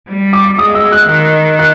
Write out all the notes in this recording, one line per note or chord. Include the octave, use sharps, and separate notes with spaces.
G3
D6
G#3 D#6
E6
F#6
D#3 F#6
F#6